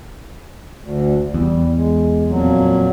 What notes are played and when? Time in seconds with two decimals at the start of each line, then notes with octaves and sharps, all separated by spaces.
0.81 D2
1.34 E2 G3
1.74 G#3
2.27 F2 A#2 F#3